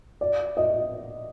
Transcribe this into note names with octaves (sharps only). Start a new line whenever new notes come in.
D5
D#5